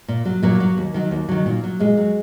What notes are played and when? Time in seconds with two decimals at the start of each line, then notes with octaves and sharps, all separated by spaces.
0.08 A#2
0.25 F#3
0.43 A#2 F#3 A#3
0.60 F#3
0.78 D#2
0.94 D#3 F#3
1.11 D#2
1.29 D#3 F#3
1.46 A#2
1.63 F#3
1.80 A#2 G#3
1.97 F#3